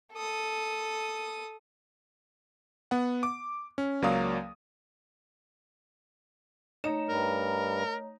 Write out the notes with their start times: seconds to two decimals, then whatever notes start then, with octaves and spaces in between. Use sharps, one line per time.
0.13 A4 D#6
2.91 B3 F#5
3.23 D6
3.78 C#4
4.02 C#2 F#3 A#3 D5 F5 D#6
6.84 A3 D#4 C#5 D#5 A#5 E7
7.09 G2 G3 A#4